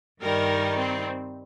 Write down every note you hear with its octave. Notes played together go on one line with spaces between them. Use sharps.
G2 D#3 G3 D#4 A#4
C4